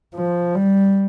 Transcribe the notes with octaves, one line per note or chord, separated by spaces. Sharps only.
F3
G3